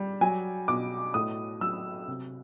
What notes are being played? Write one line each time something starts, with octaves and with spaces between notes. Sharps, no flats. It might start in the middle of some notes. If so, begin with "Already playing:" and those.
Already playing: G3
F#3 G#5
B2 D6
A2 D#6
F#3 E6
C3